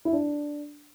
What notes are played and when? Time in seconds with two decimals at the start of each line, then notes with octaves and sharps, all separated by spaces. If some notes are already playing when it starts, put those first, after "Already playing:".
0.05 E4
0.13 D4